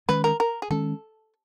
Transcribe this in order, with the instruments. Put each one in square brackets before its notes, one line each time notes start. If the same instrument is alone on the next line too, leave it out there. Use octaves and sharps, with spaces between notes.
[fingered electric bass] D#3 G#3 C#4 [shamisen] B4
[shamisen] A#4
A#4
G#4
[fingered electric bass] D#3 G#3 C#4 [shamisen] A4